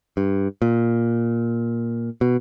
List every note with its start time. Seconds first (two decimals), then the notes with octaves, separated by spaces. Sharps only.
0.17 G2
0.62 A#2
2.21 B2